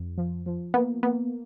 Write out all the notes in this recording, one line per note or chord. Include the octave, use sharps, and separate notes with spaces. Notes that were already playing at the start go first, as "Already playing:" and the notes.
Already playing: F2
F3
F3
A#3 B3
A#3 B3